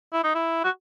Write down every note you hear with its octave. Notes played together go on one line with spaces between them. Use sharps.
E4
D#4
E4
F#4